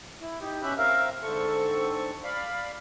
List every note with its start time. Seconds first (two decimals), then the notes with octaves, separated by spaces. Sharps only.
0.21 E4
0.40 D#4 G4
0.62 B2 C#4 G4 E5 B5 F#6
0.78 C4 A#4 E5 F5
1.22 G#2 D3 C4 A4 C#6
2.24 D5 F5 B5